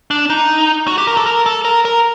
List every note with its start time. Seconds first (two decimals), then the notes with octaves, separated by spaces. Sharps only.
0.11 D4
0.30 D#4
0.88 F#4
0.98 G4
1.07 A#4
1.17 A4
1.26 A#4
1.46 A4
1.65 A#4
1.85 A#4